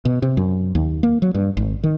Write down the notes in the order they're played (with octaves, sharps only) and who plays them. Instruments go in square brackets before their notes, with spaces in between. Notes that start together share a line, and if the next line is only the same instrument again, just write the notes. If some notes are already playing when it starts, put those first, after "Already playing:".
[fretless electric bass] B2
C3
F#2
D#2
A#3
F#3
G2
G#1
D#3